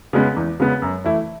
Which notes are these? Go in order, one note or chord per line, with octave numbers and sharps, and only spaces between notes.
C#3 G#3 B3
E2
C#3 G#3 B3
F#2
E3 A3 E4